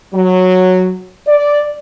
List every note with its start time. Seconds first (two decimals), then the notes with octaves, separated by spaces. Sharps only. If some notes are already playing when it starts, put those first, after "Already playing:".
0.13 F#3
1.27 D5